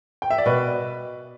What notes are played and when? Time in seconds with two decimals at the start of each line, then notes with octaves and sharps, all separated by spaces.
0.22 G5
0.30 E5
0.38 D5
0.46 B2 B4